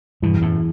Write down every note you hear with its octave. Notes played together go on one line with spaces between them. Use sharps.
E2 G2 B2
F#2 A2